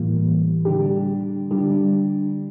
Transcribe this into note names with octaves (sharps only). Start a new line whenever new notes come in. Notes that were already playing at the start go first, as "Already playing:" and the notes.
Already playing: A2 E3 G3 A#3
D3 G3 D4 G4
D3 G3 D4 G4